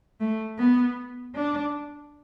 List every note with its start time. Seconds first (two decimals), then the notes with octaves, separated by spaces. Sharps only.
0.20 A3
0.59 B3
1.35 D4